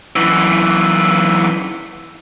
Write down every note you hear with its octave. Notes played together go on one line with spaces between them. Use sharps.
F#2 E3